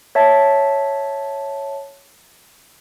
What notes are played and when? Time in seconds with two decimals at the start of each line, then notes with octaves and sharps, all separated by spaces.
0.15 C#5 E5 A5 A6